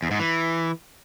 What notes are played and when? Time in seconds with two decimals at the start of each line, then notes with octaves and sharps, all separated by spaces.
0.03 E2
0.11 G#2
0.19 E3